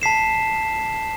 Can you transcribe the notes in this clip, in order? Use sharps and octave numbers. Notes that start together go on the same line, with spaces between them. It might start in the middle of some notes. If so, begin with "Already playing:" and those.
A5 B6 C7 E7